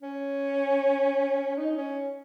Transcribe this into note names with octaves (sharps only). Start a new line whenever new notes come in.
C#4
D#4
C#4